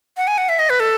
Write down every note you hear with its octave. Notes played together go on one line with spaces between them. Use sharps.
F#5
G#5
F#5
E5
D#5
B4
A4